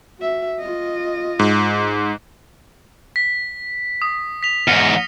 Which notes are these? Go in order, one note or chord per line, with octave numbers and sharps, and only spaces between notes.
F#4 E5
F4 D#5
G#2
B6
D#6
B6 F7
E2 G#2 F6 A#6 C#7